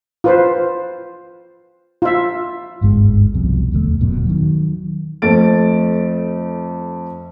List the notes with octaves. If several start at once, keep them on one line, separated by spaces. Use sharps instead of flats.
F4 B4 C5
F4 E5
D1 G1 G#2 G#3
C2 F2 B2
E1 D2 A#2 A3
D#1 F#2 B2
D#3 F#3
F2 A3 A6 D7